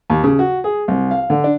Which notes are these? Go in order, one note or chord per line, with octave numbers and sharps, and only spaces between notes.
D#2
C#3
F#4
G#4
C2
F5
D3
D4